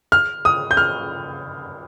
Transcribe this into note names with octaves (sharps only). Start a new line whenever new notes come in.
F6
D#6
G6
F6